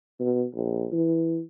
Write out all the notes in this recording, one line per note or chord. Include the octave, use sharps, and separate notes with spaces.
B2
A#1
E3